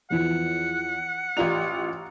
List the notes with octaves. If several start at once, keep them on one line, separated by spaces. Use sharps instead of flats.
E2 E3 F3 F#5
A1 F4 G4 D5 A#5 F7